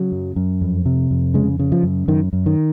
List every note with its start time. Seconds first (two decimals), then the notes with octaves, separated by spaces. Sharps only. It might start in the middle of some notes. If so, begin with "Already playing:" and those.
Already playing: C#3 F#3
0.12 F#2
0.36 F#2
0.61 F2
0.86 C3
1.11 F2
1.34 C#3 G#3
1.59 C#3
1.72 F3
1.83 F#2
2.08 F#2 D#3
2.33 F#2
2.46 D#3